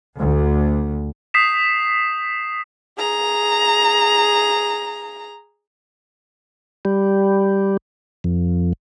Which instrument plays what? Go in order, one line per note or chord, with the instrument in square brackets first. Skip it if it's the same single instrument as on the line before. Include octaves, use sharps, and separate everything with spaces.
[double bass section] D2
[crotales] D#6 G6 B6 C7 E7
[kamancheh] G#4 A#5
[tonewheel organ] G3
F2